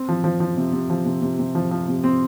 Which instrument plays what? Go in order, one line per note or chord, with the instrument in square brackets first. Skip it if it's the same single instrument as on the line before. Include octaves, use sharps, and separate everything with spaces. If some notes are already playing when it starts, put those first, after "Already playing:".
Already playing: [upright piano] C4
F3
F3
F3
C3
C3
F3
C3
C3
C3
F3
F3
C3
C4